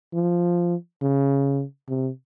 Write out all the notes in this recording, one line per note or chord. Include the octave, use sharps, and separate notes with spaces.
F3
C#3
C3